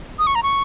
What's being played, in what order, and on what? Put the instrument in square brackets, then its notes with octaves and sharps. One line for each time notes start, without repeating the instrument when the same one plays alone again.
[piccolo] D#6
C#6
A#5
C#6